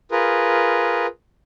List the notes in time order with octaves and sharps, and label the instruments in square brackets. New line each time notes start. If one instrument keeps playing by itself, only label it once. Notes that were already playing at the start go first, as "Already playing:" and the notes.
[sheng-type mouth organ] F4 G#4 A#4 B4